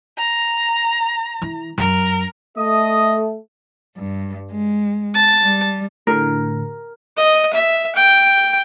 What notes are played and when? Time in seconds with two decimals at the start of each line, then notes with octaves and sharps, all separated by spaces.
0.17 A#5
1.42 E3
1.78 F#2 A#4
2.58 A3 A4 D#5 D#6
3.97 G2
4.50 G#3
5.14 A5
5.42 G3
6.07 A2 D3 A#4
7.17 D#5
7.53 E5
7.95 G5